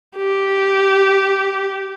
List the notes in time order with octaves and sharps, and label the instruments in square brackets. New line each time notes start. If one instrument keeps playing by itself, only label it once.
[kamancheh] G4